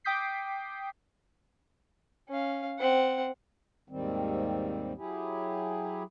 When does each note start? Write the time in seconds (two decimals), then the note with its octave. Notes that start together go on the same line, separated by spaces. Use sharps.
0.04 G5 D6 D#6 G6 B6 C7
2.29 C#4 F5
2.79 C4 F#5
3.89 D#2 G#2 D#3 G3 C4
4.97 F#3 E4 G4 G#4